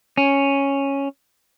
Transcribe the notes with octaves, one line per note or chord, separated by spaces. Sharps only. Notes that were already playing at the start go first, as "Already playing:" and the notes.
C#4